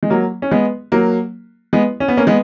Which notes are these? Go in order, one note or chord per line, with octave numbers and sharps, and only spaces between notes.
G#3
F#3 A#3
C#4
G#3 B3
F#3 A#3
G#3 B3
C#4
B3
A#3 C#4
G#3 B3